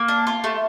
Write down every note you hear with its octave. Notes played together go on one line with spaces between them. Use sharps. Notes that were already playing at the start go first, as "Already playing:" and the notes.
Already playing: A#3
D4
F4
A3